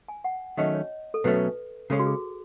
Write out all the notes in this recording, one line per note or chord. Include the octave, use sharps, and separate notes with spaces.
G#5
F#5
D#3 F#3 A3 C#4 D#5
C#5
A4
B2 F#3 A3 C#4 B4
C#3 G#3 C#4 A4
F#4
G#4